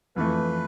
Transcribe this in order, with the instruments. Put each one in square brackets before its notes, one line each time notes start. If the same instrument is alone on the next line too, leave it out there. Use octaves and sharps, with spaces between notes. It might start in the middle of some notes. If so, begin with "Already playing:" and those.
[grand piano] F2 E3 A3 [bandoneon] B4